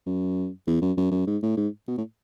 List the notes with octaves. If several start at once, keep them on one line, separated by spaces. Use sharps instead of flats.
F#2
E2
F#2
F#2
F#2
G#2
A2
G#2
B2
A2